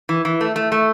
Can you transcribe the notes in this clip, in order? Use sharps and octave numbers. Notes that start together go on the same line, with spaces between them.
E3
E3
A3
A3
A3